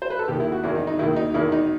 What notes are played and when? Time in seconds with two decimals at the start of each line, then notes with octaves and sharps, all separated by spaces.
0.02 C5
0.10 B4
0.19 A4
0.28 D#2 D#3 G4
0.40 E4
0.52 F#4
0.64 E2 D#3 E4
0.75 D#4
0.87 D#4
0.99 D#3 E4
1.03 D#2
1.16 D#4
1.34 E2 D#3 E4
1.52 D#4